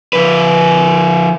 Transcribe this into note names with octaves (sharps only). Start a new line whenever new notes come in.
F3 B4